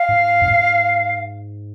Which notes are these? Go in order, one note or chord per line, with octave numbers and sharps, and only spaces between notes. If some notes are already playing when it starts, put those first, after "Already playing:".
Already playing: F5
G#2
F2
G#2